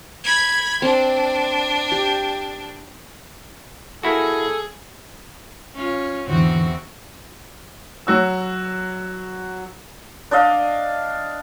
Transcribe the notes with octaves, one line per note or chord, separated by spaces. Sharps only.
B5 G#6
C4 D4
G4
A#3 E4 F#4 G#4 A4
C#4 F4
E2 G#2 D3 E3 C4 F#4
F#3 F#4 E6
D4 D5 D#5 F5